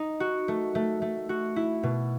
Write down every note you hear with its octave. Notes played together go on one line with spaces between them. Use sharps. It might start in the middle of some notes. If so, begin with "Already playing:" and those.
Already playing: D#4
F#4
A3
A3
A3
F#4
E4
B2